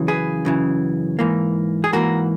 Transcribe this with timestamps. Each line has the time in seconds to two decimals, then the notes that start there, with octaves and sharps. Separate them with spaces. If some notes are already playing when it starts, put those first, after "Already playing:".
Already playing: F#2 C#3 E3
0.08 G#4 B4
0.45 F#2 C#3 E3
1.19 G#2 E3 A#3
1.84 G#4
1.93 G#2 E3 A#3 F#4 A#4